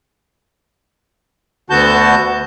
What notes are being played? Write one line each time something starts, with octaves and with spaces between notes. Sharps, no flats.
D2 D3 B3 F#4 A5 G6